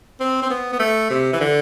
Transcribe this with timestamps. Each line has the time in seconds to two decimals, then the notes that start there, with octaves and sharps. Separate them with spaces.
0.20 C4
0.42 C4
0.50 B3
0.73 B3
0.80 A3
1.10 C3
1.33 E3
1.40 D3